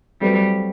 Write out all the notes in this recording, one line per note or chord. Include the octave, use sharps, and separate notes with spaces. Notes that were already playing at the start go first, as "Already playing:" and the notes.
F#3 G3 A3 C4 F#4 B4